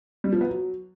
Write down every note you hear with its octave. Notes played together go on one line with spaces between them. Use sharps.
G3
F3
B3
F#3